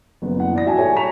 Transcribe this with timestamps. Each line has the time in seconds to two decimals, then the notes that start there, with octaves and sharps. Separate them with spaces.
0.22 F#1 B3
0.36 F#1 E4 F#5
0.53 E3 D5 A#6
0.65 F#4 E5 G#5 A5
0.77 G3 A4 C#5 G#5
0.96 A#5 B5 C#6 B6 F7